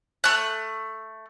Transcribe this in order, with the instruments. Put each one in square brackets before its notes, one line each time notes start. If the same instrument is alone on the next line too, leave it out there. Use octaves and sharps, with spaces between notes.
[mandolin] A3 F#6